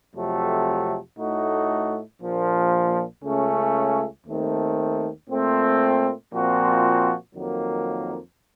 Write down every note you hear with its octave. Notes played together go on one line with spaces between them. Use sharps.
F2 C3 F#3 A3
A2 A3 D#4 F#4
A#1 A#2 F3
C#2 C#3 A3 C#4
D#2 D#3 A3 C4
A#2 A3 C4
A#2 F3 C4 F#4
F2 D#3 F#3 A#3